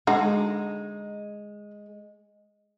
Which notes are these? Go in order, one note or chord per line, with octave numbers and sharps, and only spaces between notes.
D3 G#3 D#4 F#4